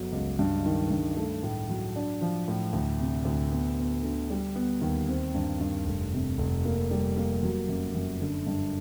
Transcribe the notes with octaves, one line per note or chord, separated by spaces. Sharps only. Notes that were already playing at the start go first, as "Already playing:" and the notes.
Already playing: G1 F#3 B3
C#2
G2
D#3
G2
A3
A2
F#3
D4
F3
A2
D2
C3
D2
B3
B3
D3
G3
B3
D#2
C4
G2
G2
F1
C3
F1
A#3
G3
A#3
F#3
F#2
F#2
D3
G2